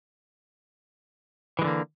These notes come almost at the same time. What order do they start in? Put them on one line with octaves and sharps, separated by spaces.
E3 G#3 D3 A#3